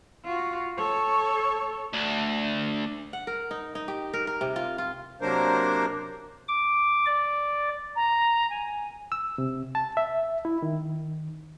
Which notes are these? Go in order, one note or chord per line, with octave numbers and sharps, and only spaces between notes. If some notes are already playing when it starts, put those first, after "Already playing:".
F4 F#4
A4 C#5
D2 D4
F#5
A#4
D#4
D#4
G4
A#4
A#4
C3
F4
F4
C3 F#3 A#3 D4 A#4 C5
D6
D5
A#5
G#5
E6
C3
A5
E5
E4
D#3